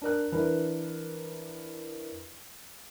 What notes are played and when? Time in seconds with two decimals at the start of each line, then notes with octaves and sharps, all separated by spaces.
0.02 D4 A#4 F#6
0.32 E3 D4 E4 A#4 B4